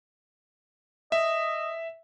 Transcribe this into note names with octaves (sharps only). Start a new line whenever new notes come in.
D#5 E5